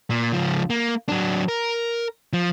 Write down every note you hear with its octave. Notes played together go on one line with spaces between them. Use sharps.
A#2
C#2 F3
A#3
F#3 D4
A#4
F3